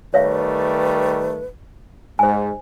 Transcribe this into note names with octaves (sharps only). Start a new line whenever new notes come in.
D#3 G3 A3 B4 C#5 E5 F5
G#2 G#3 C5 G#5